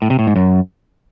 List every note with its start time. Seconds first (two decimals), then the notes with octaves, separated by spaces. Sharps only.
0.02 A2
0.10 C3
0.19 A2
0.27 G#2
0.36 F#2